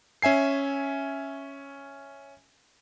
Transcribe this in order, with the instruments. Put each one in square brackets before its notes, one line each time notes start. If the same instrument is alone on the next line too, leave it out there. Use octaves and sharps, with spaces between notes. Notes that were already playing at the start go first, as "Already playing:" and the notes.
[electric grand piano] C#4 E5 G#5 C7